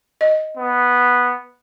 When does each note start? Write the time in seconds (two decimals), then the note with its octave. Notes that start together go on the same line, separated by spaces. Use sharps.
0.21 D#5
0.57 B3